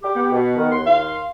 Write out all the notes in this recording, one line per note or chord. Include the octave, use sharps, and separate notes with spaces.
G4
B3
B2
D#3
D#2 C6
F5